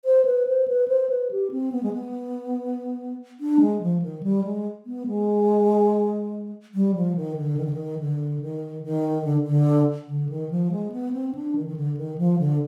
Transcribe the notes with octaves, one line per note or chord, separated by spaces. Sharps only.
C5
B4
C5
B4
C5
B4
G4
C4
B3
G#3
B3
D4
G#3
F3
D#3
G3
G#3
B3
G#3
G3
F3
D#3
D3
D#3
D3
D#3
D3
D#3
D#3
D3
D3
D3
D#3
F3
G#3
B3
C4
D4
D#3
D#3
D3
D#3
F3
D3